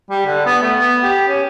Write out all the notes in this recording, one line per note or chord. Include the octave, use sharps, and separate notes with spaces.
G3
D3
B3
A3
B3
G4
C#4